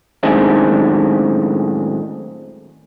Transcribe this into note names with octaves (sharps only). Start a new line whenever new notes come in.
F#2 A2 D#3 G#3 C4 D4